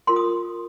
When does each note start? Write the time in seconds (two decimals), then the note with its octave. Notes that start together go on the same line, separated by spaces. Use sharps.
0.07 F4 A#4 C6
0.16 D#6